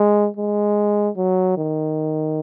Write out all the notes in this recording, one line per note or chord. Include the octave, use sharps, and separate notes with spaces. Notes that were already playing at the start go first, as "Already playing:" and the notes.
Already playing: G#3
G#3
F#3
D#3